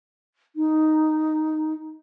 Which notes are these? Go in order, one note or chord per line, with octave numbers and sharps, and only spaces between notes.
D#4